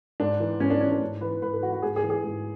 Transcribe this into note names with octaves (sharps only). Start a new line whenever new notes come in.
G#2 D4
E3
G#2 C#4
D4
E3 C#4
D4
G#2
E3 B4
G#2 B4
A4
E3 F#4
F#4
G#2 G#4
G#4
E3
G#4
G#2